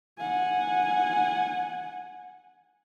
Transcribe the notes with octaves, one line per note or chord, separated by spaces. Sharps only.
F#5 G#5